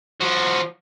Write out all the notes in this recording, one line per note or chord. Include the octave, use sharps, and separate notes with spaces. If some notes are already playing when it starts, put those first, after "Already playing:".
F3 F#4